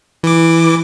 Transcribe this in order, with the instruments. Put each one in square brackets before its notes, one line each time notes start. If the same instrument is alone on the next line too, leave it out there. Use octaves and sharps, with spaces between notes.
[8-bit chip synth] E3 D6